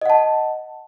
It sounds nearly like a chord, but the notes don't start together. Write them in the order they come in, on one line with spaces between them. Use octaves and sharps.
D#5 F#5 A5